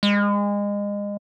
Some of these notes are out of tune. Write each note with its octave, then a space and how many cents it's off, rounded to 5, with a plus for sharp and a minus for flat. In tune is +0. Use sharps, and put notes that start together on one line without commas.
G#3 -30